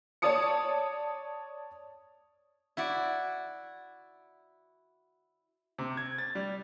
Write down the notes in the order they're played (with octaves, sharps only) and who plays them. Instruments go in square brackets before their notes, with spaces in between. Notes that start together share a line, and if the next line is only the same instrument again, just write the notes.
[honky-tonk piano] C#5 D5 A5 D#6 C#7
[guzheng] E4 F#4 D5
[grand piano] C3
G#6
A6
G3